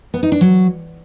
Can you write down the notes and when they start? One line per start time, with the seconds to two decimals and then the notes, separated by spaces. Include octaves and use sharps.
0.14 B3
0.23 D#4
0.32 D4
0.41 F#3